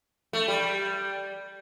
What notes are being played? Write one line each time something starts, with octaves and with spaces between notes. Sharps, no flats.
A3
G3